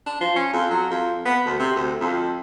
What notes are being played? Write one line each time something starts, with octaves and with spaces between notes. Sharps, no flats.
D4
F3
C#4
F2
F#3
F2
B3
D2
C3
D2
F2